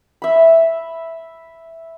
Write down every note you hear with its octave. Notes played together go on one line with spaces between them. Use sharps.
E5 B5